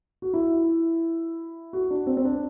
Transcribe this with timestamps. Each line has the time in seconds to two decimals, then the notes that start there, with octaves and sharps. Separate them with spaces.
0.22 F#4
0.34 E4
1.73 F#4
1.91 D4
2.07 C4
2.17 C4
2.25 D4